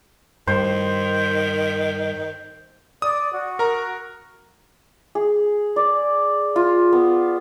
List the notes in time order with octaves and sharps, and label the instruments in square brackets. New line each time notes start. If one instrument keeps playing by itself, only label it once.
[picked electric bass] G2 [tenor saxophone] D#3 [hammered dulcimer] C5
[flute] D5 [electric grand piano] D#6
[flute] F#4
[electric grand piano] A#4 A#5
[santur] G#4
D5
F4
B3